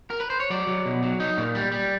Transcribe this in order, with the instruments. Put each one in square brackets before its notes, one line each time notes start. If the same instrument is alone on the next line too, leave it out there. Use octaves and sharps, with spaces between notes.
[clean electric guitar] A#4
B4
C5
C#5
F#3 D5
F#3
B2
F#3
D#4
A#2
G3
G3